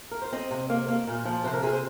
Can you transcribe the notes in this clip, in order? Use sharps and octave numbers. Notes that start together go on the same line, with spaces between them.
A#4
C5
C4 D#5
C3
A#3
A#3
A#2
F3
C3 C5
A#4
C3 G#4
C5